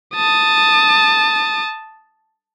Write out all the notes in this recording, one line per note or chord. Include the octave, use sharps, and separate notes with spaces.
A5 D#6